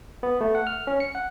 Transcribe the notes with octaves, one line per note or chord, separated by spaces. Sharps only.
B3
A3
F#5
F6
C#4
C#7
F#5